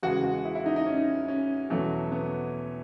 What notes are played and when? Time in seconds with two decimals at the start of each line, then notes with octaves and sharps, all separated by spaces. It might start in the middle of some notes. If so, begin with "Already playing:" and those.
0.03 E2 C#3 G#3 F#4
0.24 F#4
0.45 E4
0.55 E4
0.66 D#4
0.76 D#4
0.86 C#4
1.28 C#4
1.70 E2 B2 F#3 A3
2.12 B3